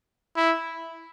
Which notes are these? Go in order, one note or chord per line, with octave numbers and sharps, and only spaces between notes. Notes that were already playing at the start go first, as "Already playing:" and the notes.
E4